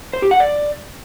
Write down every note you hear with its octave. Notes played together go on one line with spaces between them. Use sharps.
C5
G4
F#5
D5